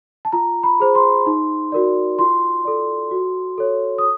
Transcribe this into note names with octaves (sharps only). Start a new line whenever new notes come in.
A5
F4 A#5
B5
G#4 C5
C6
D#4
F#4 A#4 D5
F4 C6
A4 D5
F#4
A4 C#5
D#6